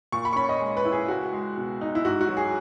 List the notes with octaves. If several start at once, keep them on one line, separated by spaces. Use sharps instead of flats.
A#2 C#6
B5
C#6
C#4 B5
D#5
G#3
B4
E4
G#4
C#2 F#4
G#3
B2
D#4
E4
G#2 F#4
F#4
F#3
G#4